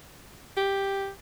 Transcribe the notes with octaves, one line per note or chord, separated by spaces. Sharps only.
G4